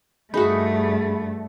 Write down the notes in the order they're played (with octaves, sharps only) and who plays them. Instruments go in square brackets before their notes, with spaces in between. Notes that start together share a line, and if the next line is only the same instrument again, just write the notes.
[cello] G2 A3 [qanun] D#4 F#4 [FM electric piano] G#4 B5